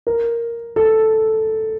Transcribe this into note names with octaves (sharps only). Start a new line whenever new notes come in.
A#4
A4